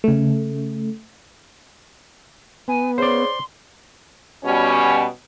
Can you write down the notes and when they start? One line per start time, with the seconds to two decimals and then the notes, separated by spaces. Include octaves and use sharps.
0.04 C#3 A3
2.68 B3 G#5
2.98 C#3 C5 D5 C6
4.44 B2 G3 C#4